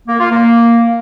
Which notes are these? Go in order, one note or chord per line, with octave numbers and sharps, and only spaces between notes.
A#3
F4
A#3